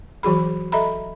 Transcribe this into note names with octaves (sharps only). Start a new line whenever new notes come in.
E3 F#3 F#4 G#4 B5
A4 D#5 E5 A#5 B5